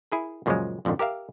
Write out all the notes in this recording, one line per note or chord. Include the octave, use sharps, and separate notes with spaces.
E4 G#4 A#4
F#2 A#2 C#3 F3 F#3 G#3
A#1 F2 G#2 D3 D#3
G4 A#4 E5 F5